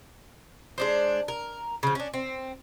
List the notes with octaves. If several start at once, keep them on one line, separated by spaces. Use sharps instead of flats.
G#3 D4 C5
A#4
C#3 F3
C#4 D4
C4